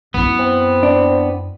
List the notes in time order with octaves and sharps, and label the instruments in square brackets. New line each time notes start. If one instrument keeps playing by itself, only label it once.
[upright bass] F#2 E4 [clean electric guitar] B3
[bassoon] C4
[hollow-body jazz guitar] D4